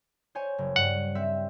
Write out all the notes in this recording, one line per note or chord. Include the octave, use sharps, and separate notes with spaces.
C5 C#5 G#5
F#1
G2 F#5
C4 E5